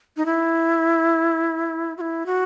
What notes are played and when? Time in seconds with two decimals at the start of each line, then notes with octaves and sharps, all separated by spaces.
0.17 D#4
0.26 E4
1.97 F#4
2.01 E4
2.26 F#4